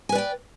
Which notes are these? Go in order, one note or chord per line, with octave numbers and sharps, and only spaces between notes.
B4 D5 G5 G#5